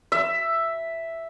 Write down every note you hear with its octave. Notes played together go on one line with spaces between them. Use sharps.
E5